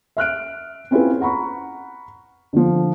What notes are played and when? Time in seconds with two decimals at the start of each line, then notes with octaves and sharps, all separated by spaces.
0.17 E5 F6 F#6 D7
0.91 C4 C#4 E4 F4 G#4 B4
1.21 F#5 A#5 B5 C#6
2.53 D3 F3